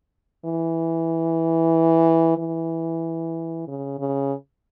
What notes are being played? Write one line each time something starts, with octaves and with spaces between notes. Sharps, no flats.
E3
E3
C#3
C#3